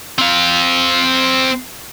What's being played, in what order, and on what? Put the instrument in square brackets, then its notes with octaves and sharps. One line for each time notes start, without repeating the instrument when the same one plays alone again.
[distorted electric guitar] C4 F5